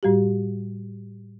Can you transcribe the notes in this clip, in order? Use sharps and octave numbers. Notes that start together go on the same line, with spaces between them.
A2 G3 F#4 G4